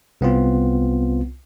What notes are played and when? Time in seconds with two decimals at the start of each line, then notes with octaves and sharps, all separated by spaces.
0.21 C2 B3 C4 F4